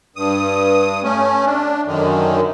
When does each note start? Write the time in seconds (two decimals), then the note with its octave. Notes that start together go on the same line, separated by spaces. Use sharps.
0.16 G2 D#6
1.04 A3 C#4
1.45 D4
1.87 F#2 D3 D#3